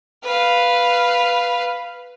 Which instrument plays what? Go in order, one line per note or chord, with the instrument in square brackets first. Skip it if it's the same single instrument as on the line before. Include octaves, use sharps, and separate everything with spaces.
[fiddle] B4 F5